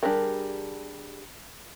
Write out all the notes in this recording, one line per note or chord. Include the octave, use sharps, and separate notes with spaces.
G3 D4 G4 G#4 A#4